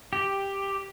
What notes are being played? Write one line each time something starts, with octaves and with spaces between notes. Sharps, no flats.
G4